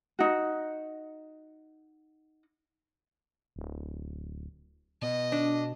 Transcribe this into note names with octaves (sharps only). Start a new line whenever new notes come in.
D#4 F#4
D1
B2 D#5
D4